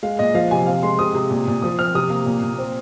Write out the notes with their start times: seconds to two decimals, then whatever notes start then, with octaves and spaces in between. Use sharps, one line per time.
0.03 G#3 F5
0.19 A#2 D#5
0.35 F3 F5
0.51 C3 G#5
0.66 C4 F5
0.83 G#3 C6
0.99 C3 D#6
1.15 C3
1.31 A#2
1.47 A#2
1.62 F3 D#6
1.79 C4 F6
1.95 C3 D#6
2.10 A#3
2.26 A#2
2.43 A#2
2.58 C4